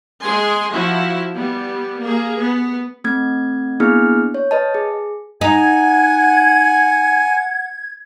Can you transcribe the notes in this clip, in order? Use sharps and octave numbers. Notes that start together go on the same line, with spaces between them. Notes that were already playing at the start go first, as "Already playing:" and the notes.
G#3 G#4 G#5 C6
F3 E4 F#4
G3 B3
A#3 G#4
B3
A3 C4 G#6
A#3 B3 D4 E4 G#4 F6
C#5
B4 D#5 A5
G#4
D#4 F#5 G#5 G#6